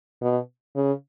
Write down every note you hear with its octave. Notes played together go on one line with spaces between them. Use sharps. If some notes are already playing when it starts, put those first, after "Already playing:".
B2
C#3